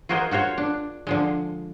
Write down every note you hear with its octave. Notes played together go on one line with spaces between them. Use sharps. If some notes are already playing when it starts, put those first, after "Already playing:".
F4 F#4 G#4 A#4 C5 D#5
F4 F#4 C5 C#5
D4
D3 F3 G#3